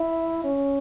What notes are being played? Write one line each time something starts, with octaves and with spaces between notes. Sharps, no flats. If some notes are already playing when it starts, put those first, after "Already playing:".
Already playing: E4
C#4